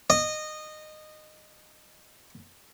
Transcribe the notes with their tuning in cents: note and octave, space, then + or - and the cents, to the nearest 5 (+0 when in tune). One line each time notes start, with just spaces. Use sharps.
D#5 -15